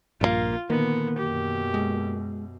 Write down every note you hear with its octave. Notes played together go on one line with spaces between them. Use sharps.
A#1 G2 C#3 A#3 F4
A#2 D3 D#3 A#3 B3
F#2 B2 G4
G#3